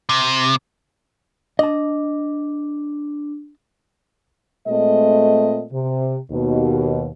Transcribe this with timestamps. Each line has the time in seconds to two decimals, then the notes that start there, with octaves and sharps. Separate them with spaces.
0.09 C3
1.59 D4 D#5 A5
4.68 A#2 G#3 A3 C4 D#5
5.73 C3
6.31 D#2 B2